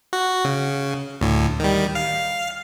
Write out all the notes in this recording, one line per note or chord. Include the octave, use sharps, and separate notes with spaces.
F#4
C#3
D2 A2
D#3 G3
F5